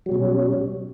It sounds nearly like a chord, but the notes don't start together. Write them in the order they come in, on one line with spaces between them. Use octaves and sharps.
F#3 G3 B2 C#4